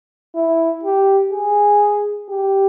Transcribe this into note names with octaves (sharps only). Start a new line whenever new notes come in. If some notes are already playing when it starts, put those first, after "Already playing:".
E4
G4
G#4
G4